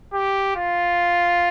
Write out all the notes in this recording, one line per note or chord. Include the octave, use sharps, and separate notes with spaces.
G4
F4